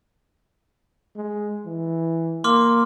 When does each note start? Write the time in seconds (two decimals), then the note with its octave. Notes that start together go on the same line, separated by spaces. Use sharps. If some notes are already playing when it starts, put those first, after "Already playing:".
1.16 G#3
1.66 E3
2.44 A#3 C6 D6 F6